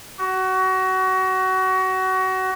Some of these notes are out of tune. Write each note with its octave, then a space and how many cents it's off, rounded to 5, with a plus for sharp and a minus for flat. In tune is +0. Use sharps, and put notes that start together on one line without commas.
F#4 +25